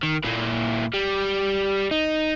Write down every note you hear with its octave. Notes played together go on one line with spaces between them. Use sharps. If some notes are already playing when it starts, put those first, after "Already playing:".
D#3
A#2 E4
G3
D#4